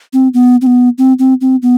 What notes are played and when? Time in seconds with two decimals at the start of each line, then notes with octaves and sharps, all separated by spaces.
0.13 C4
0.34 B3
0.62 C4
0.67 B3
0.98 C4
1.19 C4
1.41 C4
1.62 B3